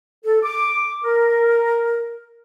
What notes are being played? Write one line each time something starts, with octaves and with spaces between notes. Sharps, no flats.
A4
D6
A#4